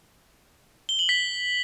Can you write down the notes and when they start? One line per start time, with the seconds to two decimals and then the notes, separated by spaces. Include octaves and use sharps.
0.89 G7
0.99 F#7
1.09 B6